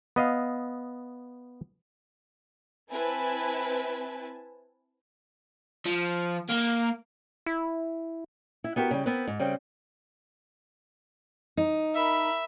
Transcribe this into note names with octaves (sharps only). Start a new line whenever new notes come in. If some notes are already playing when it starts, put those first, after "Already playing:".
B3 D#5 F5
C4 E4 B4 G#5 A5
F3
A#3
E4
E4
B3 F#4 G4 A#4
C#3 G3
B3 C4 A#4 B4
G#2
C#3 G3 C4
D#4
A#4 E5 B5